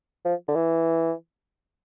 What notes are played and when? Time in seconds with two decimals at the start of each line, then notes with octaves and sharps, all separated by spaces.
0.25 F3
0.48 D3
0.56 E3